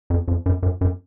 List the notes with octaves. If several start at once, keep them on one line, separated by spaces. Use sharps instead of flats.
F2
F2
F#2
F#2
F#2